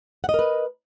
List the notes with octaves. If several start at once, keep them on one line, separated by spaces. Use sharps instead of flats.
A#4 B4 D#5 F#5